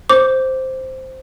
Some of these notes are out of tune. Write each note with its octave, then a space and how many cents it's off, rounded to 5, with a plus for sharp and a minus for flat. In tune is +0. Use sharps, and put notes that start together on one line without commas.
C5 +0 D6 -10